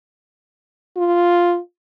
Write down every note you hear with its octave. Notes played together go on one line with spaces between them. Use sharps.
F4